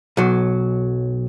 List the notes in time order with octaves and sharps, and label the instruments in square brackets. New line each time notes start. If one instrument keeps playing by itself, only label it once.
[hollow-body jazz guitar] B1 F#3